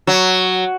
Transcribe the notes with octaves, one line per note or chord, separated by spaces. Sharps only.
F#3